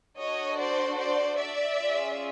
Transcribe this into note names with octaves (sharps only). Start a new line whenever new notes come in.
D4 F#4 A4 C#5 D#5
C5 D5
C5 D5
D5 E5
C#4 F4 G#4